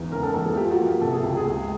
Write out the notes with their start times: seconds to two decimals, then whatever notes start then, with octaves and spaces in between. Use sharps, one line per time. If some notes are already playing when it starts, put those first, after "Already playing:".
Already playing: E2 G#2 E3
0.12 C#3 A#4
0.23 A4
0.34 E2 A4
0.45 G#4
0.56 F3 G4
0.66 F4
0.71 F#4
0.79 A#3
0.86 G4
1.01 C3 A4
1.13 G#4
1.24 C#2 G4
1.37 G#4
1.46 G#3